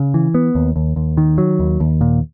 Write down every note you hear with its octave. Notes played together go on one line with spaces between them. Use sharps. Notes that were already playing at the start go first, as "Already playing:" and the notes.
Already playing: C#3
E3
B3
D#2
D#2
D#2
D#3
F#3
D#2
D#2
A#2